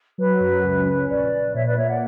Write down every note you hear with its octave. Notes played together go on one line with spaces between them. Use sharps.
F#3 B4
F#2
C#2
C#4
A#1 B4 D5
A#1
A#2 C#5 E5
B4 D5
A#3 C#5 E5
D5 F#5